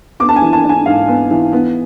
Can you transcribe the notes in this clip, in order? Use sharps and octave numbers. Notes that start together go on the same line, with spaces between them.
B3 D6
A5
G#5
E3
A5
D4
G#5
G#2 F5
B3
E3
B3